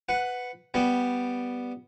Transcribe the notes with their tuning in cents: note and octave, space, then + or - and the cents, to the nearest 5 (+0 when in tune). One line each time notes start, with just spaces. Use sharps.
B4 +10 F#5 -5
G3 +0 B3 +0